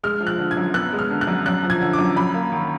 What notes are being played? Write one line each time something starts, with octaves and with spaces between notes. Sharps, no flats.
G#3 F6
F3
F#6
D3
G#6
F#2
B3 F#6
G#3
F6
D3
F#6
F#2
F#2 F#6
F3
G#6
D3
D6
F#2
F#2 B5
A#3
D#3